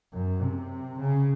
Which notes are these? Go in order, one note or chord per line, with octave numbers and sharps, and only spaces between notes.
F#2
C3
C#3